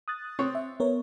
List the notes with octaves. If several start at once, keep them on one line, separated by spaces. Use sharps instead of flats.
D#6 F#6 A6
C4 C#5
E5
B3 A#4 C#5